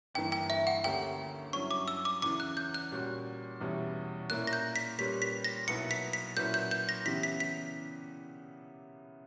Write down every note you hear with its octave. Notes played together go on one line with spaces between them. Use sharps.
G1 G2 E3 A#3 G5
G5
E5
F#5
D2 D3 A#3 C#4 G4 G5
G2 F#3 C#4 E4 C#6
D6
E6
D6
E2 C#3 E3 D6
F#6
G6
F#6
A#2 G3 C#4 F#4
E2 B2 G3 C#4 E4
A#2 A#3 C#4 E4 F#6
A#6
G6
B6
A#2 G3 C#4 G4 B4 B6
B6
A#6
B1 B2 A#3 E4 B4 C#7
B6
B6
A#2 F#3 C#4 E4 B4 G6
G6
G6
A#6
C#3 E3 B3 E4 G4 B6
B6
B6